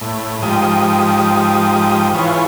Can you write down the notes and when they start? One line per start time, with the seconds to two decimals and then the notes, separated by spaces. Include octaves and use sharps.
0.01 A2
0.42 G#2 F3 G4 D#6
2.15 E3 F4 G#4 B4 C#5